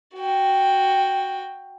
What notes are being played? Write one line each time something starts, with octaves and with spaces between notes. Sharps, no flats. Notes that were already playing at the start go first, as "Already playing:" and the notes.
F#4 G5